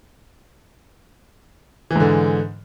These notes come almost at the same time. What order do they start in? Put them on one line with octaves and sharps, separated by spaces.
E3 G#2 D3